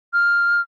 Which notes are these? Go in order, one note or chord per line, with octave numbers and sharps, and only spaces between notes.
F6